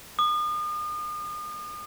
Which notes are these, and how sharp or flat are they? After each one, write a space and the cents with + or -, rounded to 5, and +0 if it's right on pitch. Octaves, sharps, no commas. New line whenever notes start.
D#6 -40